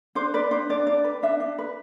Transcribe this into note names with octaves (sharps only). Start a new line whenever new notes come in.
D4 C5
B4 D5
D4 C5
D4 D5
D4 D5
B4
D4 E5
D4
B4